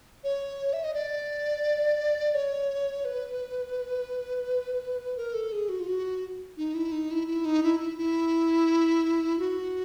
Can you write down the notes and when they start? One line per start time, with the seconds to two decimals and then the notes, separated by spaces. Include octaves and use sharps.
0.24 C#5
0.73 E5
0.84 D#5
0.94 D5
2.34 C#5
3.05 B4
5.17 A#4
5.34 A4
5.52 G#4
5.69 F#4
5.80 F4
5.88 F#4
6.57 D#4
6.74 E4
6.92 D#4
7.11 E4
7.28 E4
7.45 D#4
7.63 E4
7.80 E4
7.98 E4
9.39 F#4